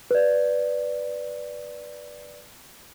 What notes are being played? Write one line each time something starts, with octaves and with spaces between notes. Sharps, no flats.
B4 D5